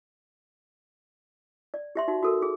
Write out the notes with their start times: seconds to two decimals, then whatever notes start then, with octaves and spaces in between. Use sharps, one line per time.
1.74 D5
1.95 G4 E5 C6
2.08 D#4 F#4
2.23 F#4 A4 A#4
2.42 G#4